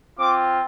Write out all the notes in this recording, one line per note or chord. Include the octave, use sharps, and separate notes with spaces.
C4 F4 D6